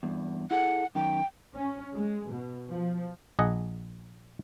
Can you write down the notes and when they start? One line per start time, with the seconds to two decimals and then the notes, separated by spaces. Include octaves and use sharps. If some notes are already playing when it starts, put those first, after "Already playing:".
0.03 E2 G2
0.51 E4 G#4 A4 F#5
0.95 F#2 D#3 G5
1.54 C#4
1.93 G#3
2.30 B2
2.69 F3
3.39 A#1 G#4 D#5 F#5